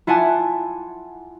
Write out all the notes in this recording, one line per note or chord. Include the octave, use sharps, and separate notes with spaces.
E4 F4 F#5 G#5 A5 D6